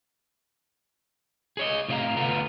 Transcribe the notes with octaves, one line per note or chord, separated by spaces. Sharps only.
G#4 C#5 D#5
A2 C3 D5 D#5 F5 A#5
D2 B3 F4 A4 A#5